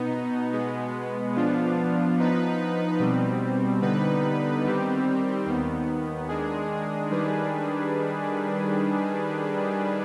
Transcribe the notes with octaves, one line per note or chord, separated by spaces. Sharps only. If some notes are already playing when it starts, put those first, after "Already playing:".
Already playing: B2 B3 D#4
B2 G#3 B3
F3 B3 D4 F4
F3 B3 D#4 B4
B2 G3 C4
D3 G3 B3 D#4 B4
D#3 G3 C4 G4
D#2 D#3 B3
D#3 G#3 D4 G#4
D#3 G3 D4 G#4 B4